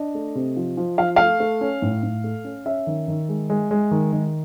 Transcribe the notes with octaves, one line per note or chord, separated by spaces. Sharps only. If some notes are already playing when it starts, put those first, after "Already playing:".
Already playing: D4 D#5
A3
C3
F3
F3
F3 F5
A3 F5
A3
C#4
A2
A2
A3
C#4
C#4 E5
D#3
D#3
G#3
G#3
G#3
D#3
D#3